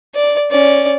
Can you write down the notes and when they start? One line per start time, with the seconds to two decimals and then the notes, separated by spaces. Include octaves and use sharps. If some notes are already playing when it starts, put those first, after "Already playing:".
0.15 D5
0.51 C#4 D5